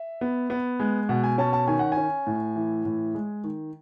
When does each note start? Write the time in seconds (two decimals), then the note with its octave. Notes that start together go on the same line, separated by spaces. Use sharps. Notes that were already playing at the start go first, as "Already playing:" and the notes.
Already playing: E5
0.21 B3
0.50 B3
0.80 G#3
1.09 B2 F#5
1.24 G#5
1.38 C#4 A5
1.53 A5
1.68 D#3 G#5
1.79 F#5
1.92 G#5
1.97 C#4
2.27 A2
2.56 E3
2.85 A2
3.15 G#3
3.44 D#3